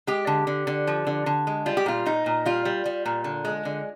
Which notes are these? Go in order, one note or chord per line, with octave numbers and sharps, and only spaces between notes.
G#3 G4
D3
D3
D3
F3
D3
D3
G#3
G3 F4
G4
A#2 F4
A#2 D#4
A#2
G3 F4
G3
G3
A#2
D3
G#3
D3